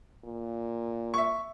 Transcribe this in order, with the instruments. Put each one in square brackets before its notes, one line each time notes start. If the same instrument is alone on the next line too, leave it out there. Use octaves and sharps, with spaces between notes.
[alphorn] A#2
[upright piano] E5 C#6